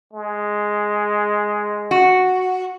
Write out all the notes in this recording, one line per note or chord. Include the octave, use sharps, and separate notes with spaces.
G#3
F#4